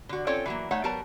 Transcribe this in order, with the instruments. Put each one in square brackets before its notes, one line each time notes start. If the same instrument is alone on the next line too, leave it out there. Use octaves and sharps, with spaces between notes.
[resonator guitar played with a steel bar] D3 F#4
C4 C#4 F4 A4 C#5 D5
E3 F#3 A#3
A3 D#4 C#5 E5 F#5
F#3 G3 B3 A#4 A5 A#5